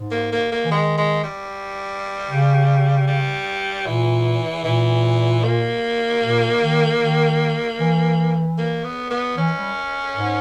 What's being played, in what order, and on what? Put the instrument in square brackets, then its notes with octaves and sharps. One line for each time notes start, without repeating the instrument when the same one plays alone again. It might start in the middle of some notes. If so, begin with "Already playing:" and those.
Already playing: [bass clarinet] G#2
[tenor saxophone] A#3
A#3
A#3
[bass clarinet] E3
[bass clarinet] D#3 [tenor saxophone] G#3
[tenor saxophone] G#3
G3
[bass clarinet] C#3
[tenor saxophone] G3
[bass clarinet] A#2 [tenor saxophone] E3
[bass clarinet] A#2 [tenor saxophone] E3
[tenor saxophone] A#3
[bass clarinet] A#2
D#3
D#3
E3
[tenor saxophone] A#3
B3
B3
[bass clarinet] E3 [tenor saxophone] C#4
[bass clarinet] G3
G#2